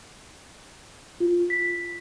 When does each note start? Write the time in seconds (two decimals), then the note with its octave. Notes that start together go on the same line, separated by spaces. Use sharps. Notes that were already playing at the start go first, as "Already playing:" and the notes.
1.20 F4
1.50 B6